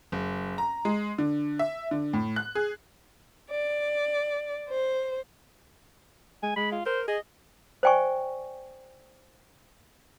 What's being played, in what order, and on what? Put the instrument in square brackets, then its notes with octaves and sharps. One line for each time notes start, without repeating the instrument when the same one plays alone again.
[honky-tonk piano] F#1
A#5
G#3
D3
E5
D3
A2
F#6
G#4
[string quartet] D5
C5
[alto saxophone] G#3 [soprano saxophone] G#5
[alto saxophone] G#3 [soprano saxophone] B5
[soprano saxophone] F4
[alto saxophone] A#4 [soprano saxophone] C5
[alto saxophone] G#4 [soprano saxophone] D#5
[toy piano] C5 D5 G5 G#5 C#6